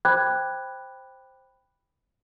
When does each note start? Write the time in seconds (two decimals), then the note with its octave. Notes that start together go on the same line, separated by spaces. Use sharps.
0.05 C5 G5 B5 D6 F#6 G#6